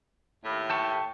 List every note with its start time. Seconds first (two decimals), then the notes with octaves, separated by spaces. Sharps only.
0.44 D#2 A2
0.70 G5 A5 C#6